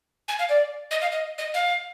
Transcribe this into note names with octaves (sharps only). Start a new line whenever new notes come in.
G#5
F5
D5
D#5
F5
D#5
D#5
F5